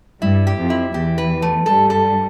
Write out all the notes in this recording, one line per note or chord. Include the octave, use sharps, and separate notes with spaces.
G2 G3 E4
G4
F2 F3
E4
E2 E3 G4
B4
A3
G2 G3 A4
A4